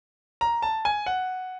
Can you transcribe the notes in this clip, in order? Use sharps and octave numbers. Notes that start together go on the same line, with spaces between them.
A#5
A5
G#5
F#5